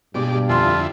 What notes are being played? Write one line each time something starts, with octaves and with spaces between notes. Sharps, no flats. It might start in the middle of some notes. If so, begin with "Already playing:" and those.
G2 B2 G3 G#3 D5 D6
F2 D3 E4 F4 G#5 A5 C6